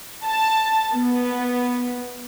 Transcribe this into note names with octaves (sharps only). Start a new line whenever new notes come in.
A5
B3